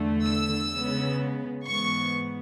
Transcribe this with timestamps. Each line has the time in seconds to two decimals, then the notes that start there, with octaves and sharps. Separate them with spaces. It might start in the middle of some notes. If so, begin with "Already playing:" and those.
Already playing: E2 D3 A3
0.23 E6
0.71 C#3 G#3 B3
1.65 G#2 E3 B3 C#6